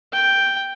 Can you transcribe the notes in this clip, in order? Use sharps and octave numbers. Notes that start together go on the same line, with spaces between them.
G5